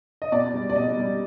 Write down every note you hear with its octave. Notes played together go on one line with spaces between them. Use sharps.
D#5
B2 D5
G3
D5
B2 D#5
G3